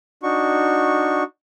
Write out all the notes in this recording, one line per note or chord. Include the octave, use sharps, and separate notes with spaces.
D4 D#4 F#4 C#6